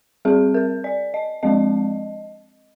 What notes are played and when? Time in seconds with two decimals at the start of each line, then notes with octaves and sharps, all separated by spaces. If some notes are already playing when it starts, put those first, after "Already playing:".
0.25 G3 C4 G#4
0.54 A#4
0.84 D5
1.14 D#5
1.43 F3 G#3 C4 D#5